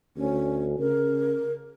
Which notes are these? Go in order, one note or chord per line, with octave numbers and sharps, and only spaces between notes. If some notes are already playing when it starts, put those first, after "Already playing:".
D2 C#4
C#3 A#4